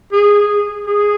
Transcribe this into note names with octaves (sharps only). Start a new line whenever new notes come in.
G#4
G#4